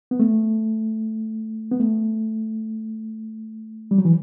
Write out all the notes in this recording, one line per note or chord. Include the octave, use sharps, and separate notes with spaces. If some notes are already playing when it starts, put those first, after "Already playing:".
B3
A3
B3
A3
G3
F#3
E3